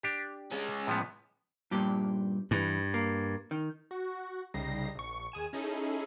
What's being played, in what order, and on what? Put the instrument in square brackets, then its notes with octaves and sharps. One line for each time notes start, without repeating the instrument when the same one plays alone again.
[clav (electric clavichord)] D4 G4
[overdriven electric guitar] G#3 C#4
[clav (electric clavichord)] A2 F3 B3
[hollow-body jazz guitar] G2 A#2 G4
[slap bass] G2 [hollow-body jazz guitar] E3
[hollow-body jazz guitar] A#3
D#3
[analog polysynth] F#4
C2 C#3 G3 D#4 A#6 C7
A#1 C#6
D#2 G#4 G#5 E7
C#4 D#4 E4 G#4 A4